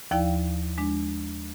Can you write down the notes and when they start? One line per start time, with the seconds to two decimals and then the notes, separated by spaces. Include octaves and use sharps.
0.11 D#2 F3 E4 D5 F5 G5
0.78 G#3 D4